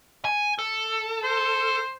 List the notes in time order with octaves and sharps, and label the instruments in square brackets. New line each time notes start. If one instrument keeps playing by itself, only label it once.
[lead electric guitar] G#5
A4
[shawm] C5